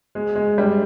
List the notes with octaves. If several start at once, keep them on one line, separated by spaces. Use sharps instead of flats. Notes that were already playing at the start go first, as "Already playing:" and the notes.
G#3
G#3
G3